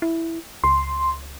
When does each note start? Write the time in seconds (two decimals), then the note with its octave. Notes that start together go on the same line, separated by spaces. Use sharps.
0.02 E4
0.64 C#2 C6